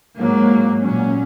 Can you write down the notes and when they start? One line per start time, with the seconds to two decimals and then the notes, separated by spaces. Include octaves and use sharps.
0.19 G#2 F#3 A#3
0.80 A#2 F#3 C#4